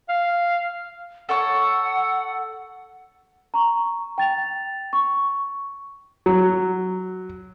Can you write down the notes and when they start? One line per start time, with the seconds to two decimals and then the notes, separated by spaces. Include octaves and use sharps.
0.09 F5
1.29 A4 C#5 F#5 C#6
3.54 A#5 C#6
4.18 G5 A6 F7
4.93 C#6
6.26 F#3